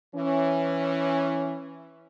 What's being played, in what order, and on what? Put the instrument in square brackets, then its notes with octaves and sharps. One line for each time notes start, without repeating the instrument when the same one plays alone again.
[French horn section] E3 C#4